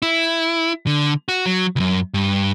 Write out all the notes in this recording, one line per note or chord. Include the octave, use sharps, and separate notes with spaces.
E4
D3
F#4
F#3
C#2 F#2
G2